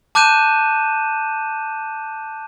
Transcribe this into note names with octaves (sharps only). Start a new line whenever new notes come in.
A5 D6 F#6 G6 D#7 E7